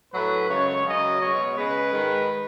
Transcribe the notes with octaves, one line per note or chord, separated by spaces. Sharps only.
A2 F#3 A3 B4
F#2 C#3 G#3 C#5
F#2 C#3 F#3 D#5
B2 G#3 C#5
C#3 G#3 B4
G#2 D#3 G#3